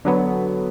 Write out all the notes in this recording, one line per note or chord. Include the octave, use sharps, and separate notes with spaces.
D3 F#3 B3